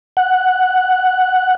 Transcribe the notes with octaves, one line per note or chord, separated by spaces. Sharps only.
F#5